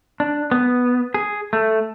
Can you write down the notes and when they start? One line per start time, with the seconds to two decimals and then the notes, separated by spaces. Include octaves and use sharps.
0.20 D4
0.51 B3
1.14 G#4
1.53 A3